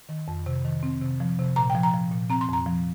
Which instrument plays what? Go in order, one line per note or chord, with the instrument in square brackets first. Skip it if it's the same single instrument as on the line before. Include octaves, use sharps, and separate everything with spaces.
[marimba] D#3
F2
C3
D#3
C4
C3
F3
C3
A#2 A#5
G5
F3
A#5
F3
A#2
C4 A#5
C6
F2 A#5
F3